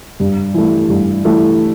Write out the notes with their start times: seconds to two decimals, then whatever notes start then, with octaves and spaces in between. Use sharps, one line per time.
0.20 G2
0.54 E3 A3
0.89 G2
1.25 E3 A3